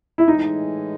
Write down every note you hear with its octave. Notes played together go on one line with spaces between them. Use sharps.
E4
A2 E3 G#3 D#4